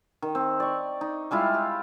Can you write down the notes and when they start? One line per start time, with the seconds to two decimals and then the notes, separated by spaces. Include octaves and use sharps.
0.22 D#3
0.35 C4
0.60 D5 C#6
1.01 D#4
1.31 G3 G#3 E4 F4
1.54 G4